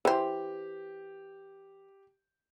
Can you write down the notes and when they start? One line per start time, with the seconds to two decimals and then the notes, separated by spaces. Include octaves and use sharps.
0.05 E3 G4 C5